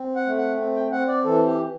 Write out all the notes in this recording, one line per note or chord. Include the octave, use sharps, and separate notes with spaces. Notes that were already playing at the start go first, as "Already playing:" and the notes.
Already playing: C4
F#5
A3
F#5
C4
G5
C4 F#5
D5
E3 A4
G4